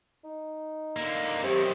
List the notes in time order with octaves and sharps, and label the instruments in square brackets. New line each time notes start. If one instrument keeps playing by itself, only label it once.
[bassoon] D#4
[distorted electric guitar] D3 A#3
[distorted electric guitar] F#2 D#3 [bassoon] C4 [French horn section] G4